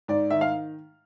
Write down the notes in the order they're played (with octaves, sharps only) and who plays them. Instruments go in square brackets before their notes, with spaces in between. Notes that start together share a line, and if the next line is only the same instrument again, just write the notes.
[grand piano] G#2 D5
D#3 E5
F5